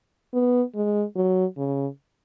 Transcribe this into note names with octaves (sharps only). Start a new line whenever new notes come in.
B3
G#3
F#3
C#3